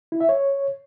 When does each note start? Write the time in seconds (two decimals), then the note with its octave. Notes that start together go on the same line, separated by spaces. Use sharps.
0.12 E4
0.21 E5
0.29 C#5